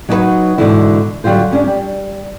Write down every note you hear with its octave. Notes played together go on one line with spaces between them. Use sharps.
F#3 D#4 F#4 G4 B4 C#5
G#2 B2 D3 E3 E4
D3 F#3 G3 F4 C5
G3 C#4 D4
G3